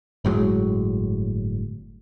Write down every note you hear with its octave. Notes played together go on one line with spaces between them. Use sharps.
G1 A2 F#3 G#3